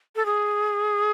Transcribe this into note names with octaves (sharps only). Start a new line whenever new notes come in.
A4
G#4